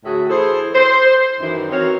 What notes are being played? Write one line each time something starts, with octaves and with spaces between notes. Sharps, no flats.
D2 A2 F#4 G#4 A4 E5
E3 G#4 A4 C5
C5
F#2 D#3 E3
C4 D#4 F#4 A#4 C#5